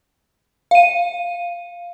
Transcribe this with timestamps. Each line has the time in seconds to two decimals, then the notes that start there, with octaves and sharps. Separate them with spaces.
0.71 F5 D#7